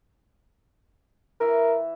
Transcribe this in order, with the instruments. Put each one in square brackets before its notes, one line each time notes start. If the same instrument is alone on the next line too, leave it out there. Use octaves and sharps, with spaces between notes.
[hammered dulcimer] E3 E5 [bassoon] A#4